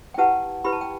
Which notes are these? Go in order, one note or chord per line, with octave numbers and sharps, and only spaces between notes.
G5
E4 G4 B4 F#5 A5
E4 G4 B4 B5
A5
G5